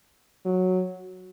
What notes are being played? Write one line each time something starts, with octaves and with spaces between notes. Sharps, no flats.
F#3